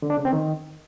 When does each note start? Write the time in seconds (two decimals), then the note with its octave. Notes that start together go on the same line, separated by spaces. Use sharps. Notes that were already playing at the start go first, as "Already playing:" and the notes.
0.02 D3
0.10 D4
0.18 C#3
0.25 C4
0.33 D#3